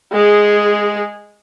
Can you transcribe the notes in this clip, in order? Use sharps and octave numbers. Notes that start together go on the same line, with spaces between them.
G#3 G#4